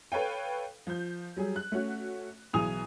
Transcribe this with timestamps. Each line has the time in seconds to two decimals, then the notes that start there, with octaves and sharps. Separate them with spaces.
0.12 A4 B4 C#5 F5 G5
0.87 F3 G6
1.37 F#3 G3 G#4
1.56 F#6
1.72 A3 C#4 F#4
2.54 B1 E3 G#4 G#5 D#6 F7